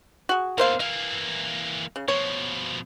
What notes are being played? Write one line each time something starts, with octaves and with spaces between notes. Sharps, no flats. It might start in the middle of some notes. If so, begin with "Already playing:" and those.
F#4 G#4
E2 D3 A#3 C5 F5
E3 A#3 F5
C#3
B2 F3 C#5